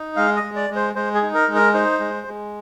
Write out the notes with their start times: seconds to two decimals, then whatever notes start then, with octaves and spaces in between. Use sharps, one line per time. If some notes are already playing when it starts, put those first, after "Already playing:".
Already playing: D#4
0.16 G#3 F5
0.36 D#5
0.43 G#3
0.56 D5
0.70 G#3
0.76 C5
0.95 G#3 C5
1.15 G#4
1.22 D#4
1.34 A#4
1.48 G#3
1.55 A#4
1.74 D#4 C5
2.00 G#3
2.27 G#3